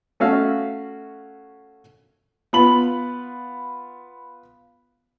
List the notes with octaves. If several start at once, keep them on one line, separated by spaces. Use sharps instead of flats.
A3 C#4 F#4 E5 F5
B3 F4 B5 F#7